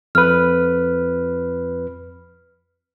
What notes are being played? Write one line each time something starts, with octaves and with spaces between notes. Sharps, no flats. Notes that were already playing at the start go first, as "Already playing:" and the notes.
F2 B4 F6